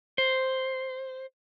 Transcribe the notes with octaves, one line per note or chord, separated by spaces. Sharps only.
C5